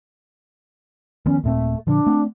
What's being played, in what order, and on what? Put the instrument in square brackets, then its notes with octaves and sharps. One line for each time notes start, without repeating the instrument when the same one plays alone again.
[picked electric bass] D#3 F3 B3 [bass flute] C#4
[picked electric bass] D#1 A#2 C4 [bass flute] A3
[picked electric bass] A#2 D3 F3 [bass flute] D4
[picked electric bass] A3 C4